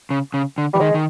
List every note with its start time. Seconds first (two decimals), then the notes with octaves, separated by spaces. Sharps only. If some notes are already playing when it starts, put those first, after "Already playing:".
0.10 C#3
0.34 C#3
0.58 D3
0.73 E3 G3
0.80 D#3 G#3
0.94 D#3